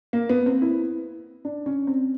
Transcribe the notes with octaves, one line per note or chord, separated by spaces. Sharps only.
A#3
B3
C4
E4
D4
C#4
C4